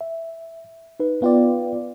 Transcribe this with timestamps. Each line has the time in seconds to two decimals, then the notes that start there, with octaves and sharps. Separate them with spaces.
0.01 E5
1.00 D#4 B4
1.22 B3 F4 B4 D5 F5 G5